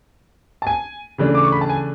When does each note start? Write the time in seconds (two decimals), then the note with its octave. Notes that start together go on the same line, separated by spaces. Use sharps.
0.62 A5
0.67 G#5
1.18 C#3 E3 A3 D4
1.35 D6
1.44 C#6
1.52 B5
1.61 A5
1.69 G#5